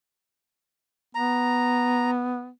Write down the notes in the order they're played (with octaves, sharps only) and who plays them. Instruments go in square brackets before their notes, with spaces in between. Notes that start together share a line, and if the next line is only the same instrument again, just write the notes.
[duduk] B3 [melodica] A#5